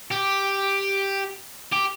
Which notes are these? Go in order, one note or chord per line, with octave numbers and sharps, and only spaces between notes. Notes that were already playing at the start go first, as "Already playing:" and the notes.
G4
G4